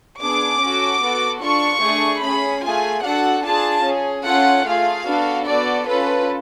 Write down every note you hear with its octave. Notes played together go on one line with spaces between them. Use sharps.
B3 D4 G#4 D6
C#4 F#4 A4
B3 F#4 A4
D4 F4 A4 C#6
A3 D4 G#4
C#4 G#4 B5
A3 F4 G#4 G#5
D4 F#4 A4 F#5
D4 F4 G#4 A5
C#4 G#4
C#4 F4 A4 F#5
A3 F4 G#4 F5
B3 D4 F#4 A4
B3 F#4 A4 D5
C#4 F4 A4 B4